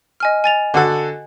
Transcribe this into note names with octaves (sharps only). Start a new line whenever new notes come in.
D#5 G#5 F6
G#5 A6 F7
D3 F#4 A4